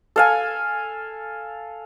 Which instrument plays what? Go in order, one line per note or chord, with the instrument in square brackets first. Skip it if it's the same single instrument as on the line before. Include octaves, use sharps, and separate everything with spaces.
[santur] A4 F5 G#5